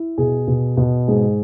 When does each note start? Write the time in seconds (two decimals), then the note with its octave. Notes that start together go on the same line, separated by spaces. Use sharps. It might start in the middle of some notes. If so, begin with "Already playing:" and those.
Already playing: E4
0.18 B2 G#4
0.47 B2
0.77 B2
1.08 G#2 G#4